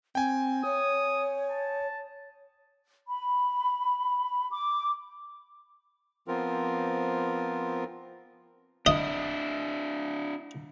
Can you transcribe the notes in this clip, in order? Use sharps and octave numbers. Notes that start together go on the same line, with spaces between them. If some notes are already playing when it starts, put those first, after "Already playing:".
C4 G5 G#5
C#5 D#6
A5
B5
D6
F3 B3 C4 F4 A#4
D4 E4 D#5